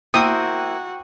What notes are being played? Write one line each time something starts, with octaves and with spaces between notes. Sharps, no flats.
A#3 E4 F#4 C5 G5 D#6 E6